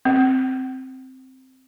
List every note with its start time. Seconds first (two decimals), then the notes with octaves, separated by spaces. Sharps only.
0.05 C4